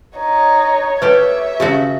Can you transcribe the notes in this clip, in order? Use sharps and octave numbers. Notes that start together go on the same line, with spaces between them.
D#4 C#5
A3 G4 B4 E5
C#3 A3 F#4 G4